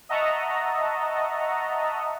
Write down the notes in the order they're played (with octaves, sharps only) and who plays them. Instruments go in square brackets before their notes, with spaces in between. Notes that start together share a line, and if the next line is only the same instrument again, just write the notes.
[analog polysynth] D#5 E5 F#5 A5 A#5 C#6